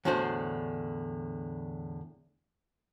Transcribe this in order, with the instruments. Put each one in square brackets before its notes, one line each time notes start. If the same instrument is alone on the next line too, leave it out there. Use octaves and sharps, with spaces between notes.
[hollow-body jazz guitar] E2 A2 D3 D4 F#4 C5